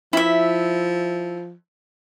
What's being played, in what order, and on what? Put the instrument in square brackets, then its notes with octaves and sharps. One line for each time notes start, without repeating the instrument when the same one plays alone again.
[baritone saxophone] F3 [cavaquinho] E4 E5